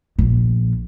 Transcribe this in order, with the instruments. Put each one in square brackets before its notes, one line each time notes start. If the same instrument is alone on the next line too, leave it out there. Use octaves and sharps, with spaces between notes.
[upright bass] A#1